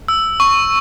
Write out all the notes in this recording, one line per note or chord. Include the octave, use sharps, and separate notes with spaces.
E6
C#6